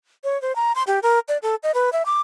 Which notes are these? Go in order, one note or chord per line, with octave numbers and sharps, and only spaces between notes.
C#5
C5
A#5
C6
G4
A#4
D5
A4
D#5
B4
E5
D6